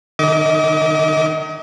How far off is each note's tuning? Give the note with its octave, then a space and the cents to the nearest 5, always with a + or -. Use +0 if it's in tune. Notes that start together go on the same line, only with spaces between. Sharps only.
D#3 -30 D#5 +35 D6 -20